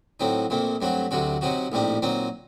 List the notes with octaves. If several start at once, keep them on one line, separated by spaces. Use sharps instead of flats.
A2 F#3 C4 D#4
A#1 A#2 A3 C4
G2 F#3 A3 C4 F#4
D2 C3 F#3 C4 F#4
C3 F#3 C4 D#4 F#4
A#1 A2 G3 C4 D#4
A#2 F#3 C4 D#4